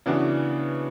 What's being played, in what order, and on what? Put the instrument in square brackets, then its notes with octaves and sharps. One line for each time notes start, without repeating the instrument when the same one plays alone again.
[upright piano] C#3 E3 B3 D4 F#4